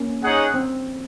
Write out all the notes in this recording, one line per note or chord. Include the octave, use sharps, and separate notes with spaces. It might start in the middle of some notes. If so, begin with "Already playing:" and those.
Already playing: A#3 C#4
D#4 G#4 C#5 F#5
C4